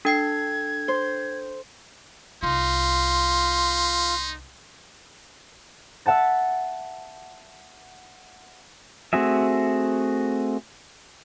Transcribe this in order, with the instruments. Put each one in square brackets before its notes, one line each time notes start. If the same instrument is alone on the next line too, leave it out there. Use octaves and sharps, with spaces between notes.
[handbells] D4 G5 C7 [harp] A4 [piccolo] G#6
[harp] C5
[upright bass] C2 [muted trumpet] D#4 [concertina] F4 [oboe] C6
[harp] E5 F#5 A5 A6
[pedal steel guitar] A3 C4 F#4 G#4 E5